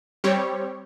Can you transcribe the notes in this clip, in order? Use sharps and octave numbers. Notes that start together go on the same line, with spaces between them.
G3 C4 G4 C#5